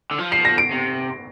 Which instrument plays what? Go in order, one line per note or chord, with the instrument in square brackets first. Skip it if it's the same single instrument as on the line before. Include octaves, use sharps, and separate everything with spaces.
[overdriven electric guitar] D3
F3
[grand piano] C7
A#6
D7
[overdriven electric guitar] C3